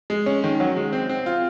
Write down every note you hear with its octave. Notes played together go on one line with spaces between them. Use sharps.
G#3
C#4
D#3
F#3
G#3
C4
C4
F4